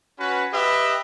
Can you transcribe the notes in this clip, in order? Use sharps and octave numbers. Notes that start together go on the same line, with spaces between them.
C#4 F#4 B4
G4 B4 D#5 E5